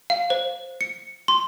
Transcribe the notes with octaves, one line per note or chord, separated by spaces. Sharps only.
F5
C5
C#7
C6